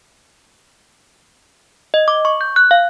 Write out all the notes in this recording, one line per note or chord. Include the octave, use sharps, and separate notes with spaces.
D#5
D6
C#6
G6
F#6
F5